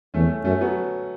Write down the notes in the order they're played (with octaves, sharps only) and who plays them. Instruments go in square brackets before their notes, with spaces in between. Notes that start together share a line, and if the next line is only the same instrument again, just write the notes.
[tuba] E2 [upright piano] A3 C#4
[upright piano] A3 C#4
[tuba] F#2 [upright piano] A3 C#4
[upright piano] F#3 B3